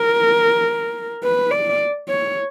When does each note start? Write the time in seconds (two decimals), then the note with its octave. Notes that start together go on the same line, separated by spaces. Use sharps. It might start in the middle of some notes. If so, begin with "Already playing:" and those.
Already playing: A#4
1.24 B4
1.51 D5
2.09 C#5